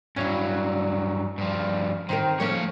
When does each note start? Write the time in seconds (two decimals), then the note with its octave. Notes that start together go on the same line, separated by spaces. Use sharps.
0.16 G2 F#3 C#4 E4
1.38 G2 F3
2.09 D#3 C4 D#4 A#4
2.40 F3 A3 A#3 C#4 C#5